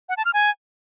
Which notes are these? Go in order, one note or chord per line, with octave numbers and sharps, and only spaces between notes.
F#5
A5
F6
G#5